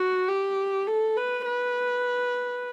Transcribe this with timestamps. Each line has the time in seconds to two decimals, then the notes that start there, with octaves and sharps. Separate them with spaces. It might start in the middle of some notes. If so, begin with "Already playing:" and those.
Already playing: F#4
0.28 G4
0.87 A4
1.17 B4
1.46 B4